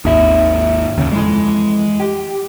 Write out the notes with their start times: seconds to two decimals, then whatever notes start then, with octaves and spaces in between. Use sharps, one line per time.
0.05 G#1 D#2 D#4 E5
0.98 D#2 C#3
1.12 F2 E3 G#3
2.00 G4